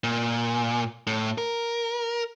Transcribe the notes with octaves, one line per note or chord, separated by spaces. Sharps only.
A#2
A2
A#4